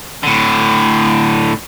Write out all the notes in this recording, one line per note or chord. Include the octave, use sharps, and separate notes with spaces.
A2 D3